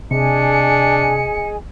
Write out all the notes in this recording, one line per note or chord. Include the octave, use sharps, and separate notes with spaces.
C3 D4 G#4 D#5 G#5 C#7